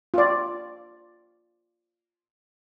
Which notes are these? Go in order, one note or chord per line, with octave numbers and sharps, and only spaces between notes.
F4 D5